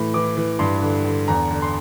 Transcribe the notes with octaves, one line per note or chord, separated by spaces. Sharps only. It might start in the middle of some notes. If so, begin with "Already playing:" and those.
Already playing: A2 E3
E3 D6
E3
G2 C6
D3
D3
E2 A#5
D3
C6